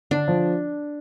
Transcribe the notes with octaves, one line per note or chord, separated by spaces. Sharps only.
D3 D4
F3